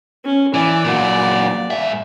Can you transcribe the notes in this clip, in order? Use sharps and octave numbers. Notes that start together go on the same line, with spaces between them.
C#4
E3 D5
A#2 F#3
G#2 E5